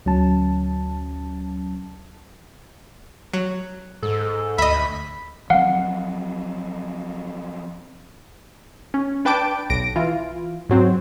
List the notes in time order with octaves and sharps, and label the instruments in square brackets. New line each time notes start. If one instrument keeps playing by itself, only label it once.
[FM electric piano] D2 F#3 C#4 A5
[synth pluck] F#3
[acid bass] G#2 [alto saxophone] A4
[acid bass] D2 [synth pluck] D#5 E5 [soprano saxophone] B5
[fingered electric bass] F3 F#3 C4 [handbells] F5 F#5
[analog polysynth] C#4
D4 B4 G5 A5 D6 D7
B1 A#6 D7
E3 F4
G#2 F#3 C4